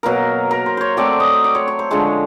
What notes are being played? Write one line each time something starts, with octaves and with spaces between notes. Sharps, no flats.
B2 F#3 A#3 A#4
A#4
C5
C5 C#5
F#3 A3 C4 D5
D#5
D5
C#5
C#5
C5
D3 F3 G#3 C#5